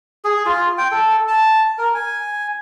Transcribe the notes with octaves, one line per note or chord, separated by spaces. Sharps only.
G#4
F4
G5
A4
A5
A#4
G#5